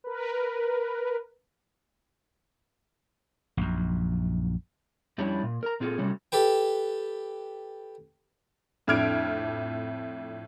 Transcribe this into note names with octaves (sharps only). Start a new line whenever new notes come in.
A#4 B4
A#1 F#2
F2 G3 C#4 D4 E4
A#2
A#4 A#5
A#2 C4 F4 G#4 A4
C3 F#3 G3 A3 C#4
G4 A4 B4 G5
F2 A2 D4 F6 G#6 D7